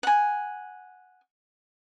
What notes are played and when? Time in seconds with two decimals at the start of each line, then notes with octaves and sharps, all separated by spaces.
0.03 F#5 G#5